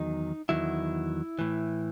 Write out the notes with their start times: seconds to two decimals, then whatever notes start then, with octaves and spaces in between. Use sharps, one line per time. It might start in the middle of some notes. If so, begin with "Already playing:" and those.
Already playing: E2 D#3 F#3 D#4
0.49 E2 D#3 F#3 E4
1.39 A2 E3